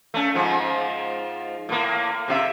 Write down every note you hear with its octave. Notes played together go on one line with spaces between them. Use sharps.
A3 C#4
G#2 F3
A2 A#3
C3 F#4 E5